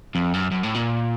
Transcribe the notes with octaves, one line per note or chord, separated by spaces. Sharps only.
F2
F#2
F#2
A2
A#2